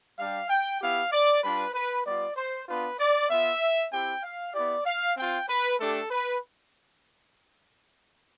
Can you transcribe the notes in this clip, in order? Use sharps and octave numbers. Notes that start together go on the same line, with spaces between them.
G3 D4 G4 F5
G5
B3 E4 G4 F5
D5
G3 D4 F4 B4
B4
G3 B3 F4 D5
C5
B3 D4 F4 B4
D5
B3 F4 E5
C4 E4 G4 G5
F5
B3 E4 G4 D5
F5
C4 F4 G5
B4
A3 D4 G4 A4
B4